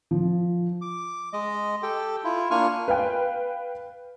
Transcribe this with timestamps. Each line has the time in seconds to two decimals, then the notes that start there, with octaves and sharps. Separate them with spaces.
0.11 F3
0.81 D6
1.33 G#3 D#5
1.83 G4 A4 G5
2.24 E4 F4
2.51 A#3 D4 F4 G#5 C#6 F6
2.88 B4 F5 G5